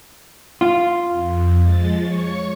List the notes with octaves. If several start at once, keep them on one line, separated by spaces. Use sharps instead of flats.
F4
F2
F3 G#3 A6
C#5 C#6